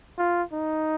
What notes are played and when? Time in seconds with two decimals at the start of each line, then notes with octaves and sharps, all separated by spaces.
0.18 F4
0.53 D#4